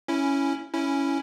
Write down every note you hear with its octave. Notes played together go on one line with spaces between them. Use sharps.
C#4 E4
C#4 E4